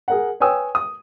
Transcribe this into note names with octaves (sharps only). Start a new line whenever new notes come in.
G#4 A#4 F#5
B4 C#5 G5 G#5 D#6 E6
D#6